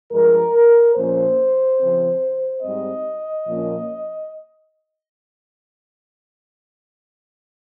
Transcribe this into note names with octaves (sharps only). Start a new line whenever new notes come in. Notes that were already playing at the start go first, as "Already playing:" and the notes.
G2 F3 G#3 A#4
A#2 F3 A#3 C#4 C5
C#3 F3 C4
G#2 G3 C4 D#5
A#2 F3 A#3 C#4